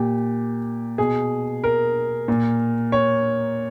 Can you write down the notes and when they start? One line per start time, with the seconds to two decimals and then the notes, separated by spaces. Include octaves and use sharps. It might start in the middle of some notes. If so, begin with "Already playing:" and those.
Already playing: A#2 G4
0.98 B2 G#4
1.64 A#4
2.28 A#2
2.92 C#5